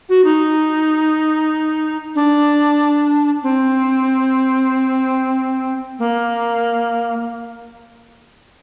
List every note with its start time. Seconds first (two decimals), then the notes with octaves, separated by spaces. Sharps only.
0.09 F#4
0.24 D#4
2.15 D4
3.43 C4
5.99 A#3